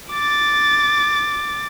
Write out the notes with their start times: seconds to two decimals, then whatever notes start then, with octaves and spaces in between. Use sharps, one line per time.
0.11 D6 A6